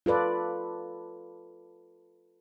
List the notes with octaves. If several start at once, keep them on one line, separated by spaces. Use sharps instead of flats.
F4 A4 B4 D5